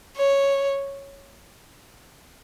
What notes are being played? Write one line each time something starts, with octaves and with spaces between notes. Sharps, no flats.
C#5